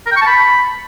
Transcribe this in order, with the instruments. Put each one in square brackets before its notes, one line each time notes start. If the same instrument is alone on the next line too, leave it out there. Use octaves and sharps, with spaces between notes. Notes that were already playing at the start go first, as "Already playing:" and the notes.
[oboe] A#4
G5
C#6
A5
B5